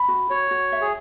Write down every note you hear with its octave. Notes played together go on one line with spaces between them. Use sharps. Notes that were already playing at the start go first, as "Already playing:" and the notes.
Already playing: B5
F#4
F#4 C#5
F#4
E5
G#4